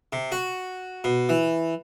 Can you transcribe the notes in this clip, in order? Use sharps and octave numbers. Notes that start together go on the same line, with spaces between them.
C3
F#4
B2
E3